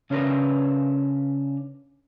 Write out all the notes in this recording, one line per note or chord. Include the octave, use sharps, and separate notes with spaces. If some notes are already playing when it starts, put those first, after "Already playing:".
C#3 C#4 D4 G4 A#4 B4